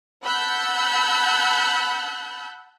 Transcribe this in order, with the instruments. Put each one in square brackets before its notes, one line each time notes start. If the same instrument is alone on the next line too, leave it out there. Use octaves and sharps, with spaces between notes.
[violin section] F#5 A5 B5 E6 F#6 G6